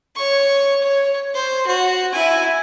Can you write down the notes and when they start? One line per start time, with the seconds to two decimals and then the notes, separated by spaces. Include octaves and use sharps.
0.16 C#5 C#6
0.83 C#5
1.35 C5
1.67 F#4
2.13 E4 G#5